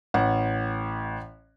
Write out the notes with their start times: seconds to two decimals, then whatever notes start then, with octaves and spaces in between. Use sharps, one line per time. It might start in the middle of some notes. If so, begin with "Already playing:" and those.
0.14 A1 F#5